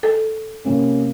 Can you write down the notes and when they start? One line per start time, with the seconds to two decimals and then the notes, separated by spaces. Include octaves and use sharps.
0.03 A4
0.65 C3 A#3 C#4